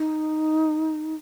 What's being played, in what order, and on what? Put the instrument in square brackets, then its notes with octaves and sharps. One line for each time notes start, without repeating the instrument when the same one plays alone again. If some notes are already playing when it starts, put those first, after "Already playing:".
Already playing: [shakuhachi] D#4